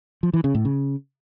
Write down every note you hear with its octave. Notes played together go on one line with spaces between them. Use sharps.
F3
E3
C#3
A2
C#3